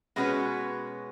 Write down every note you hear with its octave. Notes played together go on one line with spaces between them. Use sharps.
B2 G#3 C#4 F#4 B4